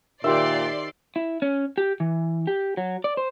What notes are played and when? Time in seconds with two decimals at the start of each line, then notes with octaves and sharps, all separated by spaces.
0.24 A#2 D#3 G4 C5 D5 E5 C6
1.16 E4
1.42 C#4
1.78 G4
2.00 E3
2.47 G4
2.77 F#3
3.04 D5
3.17 C5